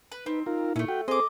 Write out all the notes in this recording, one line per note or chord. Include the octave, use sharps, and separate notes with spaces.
B4
C4 D#4 B4
D#4 F4 A#4
A#2 A3 C#4 E4
F#4 G5
C4 G#4 A4 C5 D#5 D6